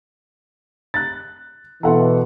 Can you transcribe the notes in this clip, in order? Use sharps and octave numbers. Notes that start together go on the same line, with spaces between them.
F#6 A6
B2 E3 A4 F#5 C6